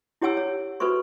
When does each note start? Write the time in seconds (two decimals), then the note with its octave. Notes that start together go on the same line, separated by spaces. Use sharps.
0.22 E4 G4 C#5 F#5 G#5 E6
0.37 C#5
0.80 F#4 A4 B4 C5 C#6